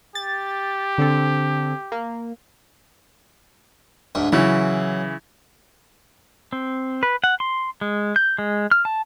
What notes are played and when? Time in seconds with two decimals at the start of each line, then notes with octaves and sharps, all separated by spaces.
0.15 G4 A6
0.98 D3 C4 A4
1.92 A#3
4.15 D2 G#2
4.32 C#3 E3 F#3 E4
6.53 C4
7.03 B4
7.24 F#5
7.40 C6
7.81 G#3
8.16 G6
8.38 G#3
8.71 F6
8.85 A5